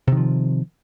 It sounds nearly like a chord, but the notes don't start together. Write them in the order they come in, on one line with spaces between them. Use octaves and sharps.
C3 D#3 F3